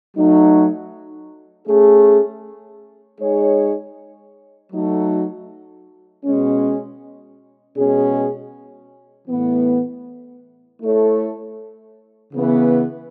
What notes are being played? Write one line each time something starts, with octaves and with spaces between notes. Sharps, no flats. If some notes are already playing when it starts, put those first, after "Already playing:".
F#3 A3 D#4
A3 C#4 G#4
G#3 D#4 G#4 C#5
F#3 A3 D#4 F#4 A4
B2 G#3 C#4
B2 G#3 C#4 G#4
A2 E3 B3
A3 E4 A4 C#5
C#3 E3 B3